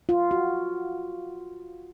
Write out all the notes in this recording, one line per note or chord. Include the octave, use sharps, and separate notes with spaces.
F4
F#4